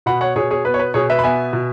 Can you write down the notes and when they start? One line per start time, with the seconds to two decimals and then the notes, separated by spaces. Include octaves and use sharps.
0.06 B2 F#5 B5
0.21 C#5 F#5
0.36 B2 G#4 C#5
0.51 G#4 C#5
0.65 B3 B4
0.74 C#5
0.79 B4
0.94 B2 G#4 C#5
1.10 B4 E5
1.19 B5
1.24 B3 E5 G#5
1.53 B2